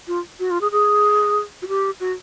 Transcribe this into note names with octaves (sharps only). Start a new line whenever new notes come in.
F4
F#4
F4
G#4
G#4
F#4
G4
F#4